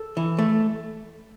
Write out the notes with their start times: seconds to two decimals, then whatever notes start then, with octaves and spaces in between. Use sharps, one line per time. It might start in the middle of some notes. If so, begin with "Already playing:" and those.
Already playing: A4
0.17 E3
0.39 A3